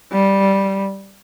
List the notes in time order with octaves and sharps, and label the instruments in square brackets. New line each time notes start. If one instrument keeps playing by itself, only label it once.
[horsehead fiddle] G3